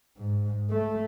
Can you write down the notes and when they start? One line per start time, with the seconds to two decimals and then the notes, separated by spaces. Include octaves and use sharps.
0.17 G#2
0.71 A3